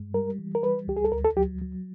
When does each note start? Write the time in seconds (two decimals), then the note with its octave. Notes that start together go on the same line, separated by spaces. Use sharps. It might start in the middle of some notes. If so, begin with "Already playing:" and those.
Already playing: G2 G#3
0.14 G3 A#4
0.39 E3
0.55 A#4
0.63 G3 B4
0.87 C#2 G4
0.97 G#4
1.05 A4
1.12 D2 A#4
1.24 A4
1.37 F#3 G4
1.61 F#3